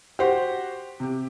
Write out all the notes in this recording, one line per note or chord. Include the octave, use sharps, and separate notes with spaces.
F#4 G4 C5 F#5
C3 G4